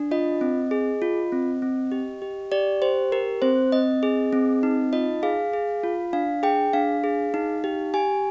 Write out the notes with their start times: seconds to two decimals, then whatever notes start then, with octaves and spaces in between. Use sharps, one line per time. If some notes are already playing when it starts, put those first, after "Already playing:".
Already playing: D4
0.11 F4 D#5
0.41 C4
0.71 G#4
1.02 F4
1.32 C4
1.62 C4
1.92 G4
2.22 G4
2.52 G4 D5
2.82 G4 C5
3.12 G4 A#4
3.42 C4 C5
3.72 C4 D#5
4.03 G#4
4.33 C4
4.63 D#4
4.93 F4 D#5
5.23 G#4 F5
5.53 G#4
5.84 F4
6.13 D4 F5
6.43 G#4 G5
6.73 D4 F5
7.04 G#4
7.34 D#4
7.64 G4
7.94 G4 G#5